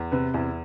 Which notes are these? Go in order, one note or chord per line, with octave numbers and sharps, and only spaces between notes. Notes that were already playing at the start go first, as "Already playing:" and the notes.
Already playing: E2
C3 B4
E2 E4